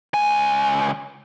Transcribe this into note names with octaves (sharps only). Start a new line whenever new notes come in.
C#2 G#5